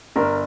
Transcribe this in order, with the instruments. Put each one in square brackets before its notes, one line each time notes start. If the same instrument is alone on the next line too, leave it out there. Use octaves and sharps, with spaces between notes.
[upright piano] G1 A#4